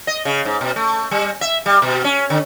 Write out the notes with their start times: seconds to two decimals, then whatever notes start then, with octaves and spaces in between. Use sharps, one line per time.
0.07 D#5
0.25 C#3
0.45 G#2
0.61 B2
0.76 A3
1.11 G3
1.41 E5
1.66 G3
1.82 B2
2.04 C#4
2.30 D3